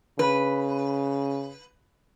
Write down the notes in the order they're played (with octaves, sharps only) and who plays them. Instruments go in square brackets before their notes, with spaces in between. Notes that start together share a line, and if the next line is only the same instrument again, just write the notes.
[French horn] C#3 [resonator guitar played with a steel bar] B4